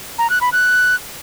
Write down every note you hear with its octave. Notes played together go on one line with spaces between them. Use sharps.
A#5
F#6
B5
F#6